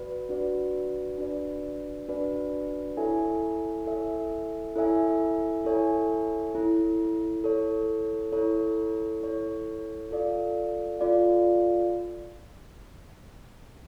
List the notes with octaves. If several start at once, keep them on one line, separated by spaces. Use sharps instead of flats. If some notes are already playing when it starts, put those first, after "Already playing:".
Already playing: F#4 B4 D5
D4 F#4 B4 D5
D4 F#4 B4 D5
D4 F#4 B4 D5
E4 A4 C#5 E5 G#5
E4 A4 C#5 E5 G#5
E4 A4 C#5 E5 G#5
E4 A4 C#5 E5 G#5
E4 A4 C#5
E4 A4 C#5
E4 A4 C#5
E4 A4 C#5
F4 A4 D5 F5
F4 A4 D5 F5